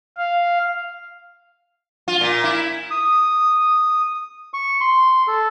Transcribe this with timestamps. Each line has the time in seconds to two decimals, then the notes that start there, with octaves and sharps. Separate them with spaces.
0.18 F5
2.08 F4
2.21 A#2
2.44 E4
2.91 D#6
4.54 C#6
4.81 C6
5.27 A4